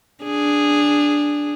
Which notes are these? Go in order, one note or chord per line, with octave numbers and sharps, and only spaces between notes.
D4 G#4